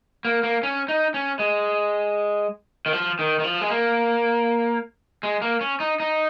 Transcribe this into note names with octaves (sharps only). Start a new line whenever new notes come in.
A#3
A#3
C#4
D#4
C#4
G#3
D#3
F3
D#3
D#3
F3
G#3
A#3
G#3
A#3
C#4
D#4
D#4